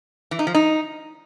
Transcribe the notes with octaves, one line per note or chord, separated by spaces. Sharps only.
E3
D#4
F3
D#4